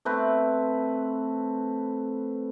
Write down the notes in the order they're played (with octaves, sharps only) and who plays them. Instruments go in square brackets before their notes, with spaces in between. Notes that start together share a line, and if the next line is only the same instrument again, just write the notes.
[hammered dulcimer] A3 C4 B4